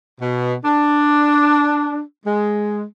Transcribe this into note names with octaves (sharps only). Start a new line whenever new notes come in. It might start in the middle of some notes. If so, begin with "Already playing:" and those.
B2
D4
G#3